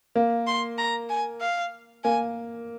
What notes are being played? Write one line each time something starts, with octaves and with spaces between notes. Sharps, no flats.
A#3
C6
A#5
G#5
F5
A#3 G#5